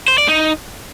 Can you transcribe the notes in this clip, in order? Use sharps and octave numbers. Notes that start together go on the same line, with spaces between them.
C5
D5
D#4